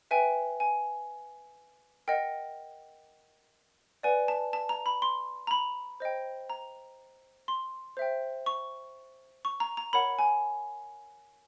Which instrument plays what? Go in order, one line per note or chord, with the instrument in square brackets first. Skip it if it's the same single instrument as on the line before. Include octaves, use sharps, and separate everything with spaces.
[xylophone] B4 E5 G5 G#5
G#5
A#4 D#5 F#5 G5
B4 D5 F#5 G#5
A5
A5
A#5
B5
C6
A#5
B5
C5 D#5 G5
A#5
C6
C5 E5 G5
C#6
C#6
A#5
A#5
A#4 C#5 F#5 B5
G#5